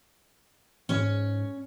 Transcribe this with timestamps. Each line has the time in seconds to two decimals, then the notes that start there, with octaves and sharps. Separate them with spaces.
0.89 G#2 C#4 C#5